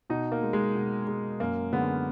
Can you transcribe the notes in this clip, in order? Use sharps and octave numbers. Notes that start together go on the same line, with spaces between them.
B2 D#4
A#3
G#3
G#3
B2
G#3
F#2 A#3
D3 G#3 B3